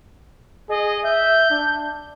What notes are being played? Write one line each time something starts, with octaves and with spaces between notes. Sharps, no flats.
G#4 D#5
E5 G6
D4